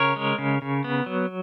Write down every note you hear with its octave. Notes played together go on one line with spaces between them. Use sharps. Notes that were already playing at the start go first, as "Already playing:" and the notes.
Already playing: C#3 A#4 C#5
G#3
C#3
C#3
B3
F#3